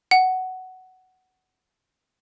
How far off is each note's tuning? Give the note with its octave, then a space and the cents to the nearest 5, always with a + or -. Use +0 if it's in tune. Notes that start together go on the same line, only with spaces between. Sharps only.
F#5 +10